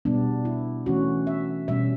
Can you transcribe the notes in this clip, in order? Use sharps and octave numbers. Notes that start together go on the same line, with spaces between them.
B2 G3 B3 D4
E4
E3 A3 C#4 F#4
E5
B2 G3 C#4 E5